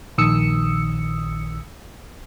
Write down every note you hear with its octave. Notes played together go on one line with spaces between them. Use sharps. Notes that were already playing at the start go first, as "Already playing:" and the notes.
A#1 D#3 D#6 E6 C#7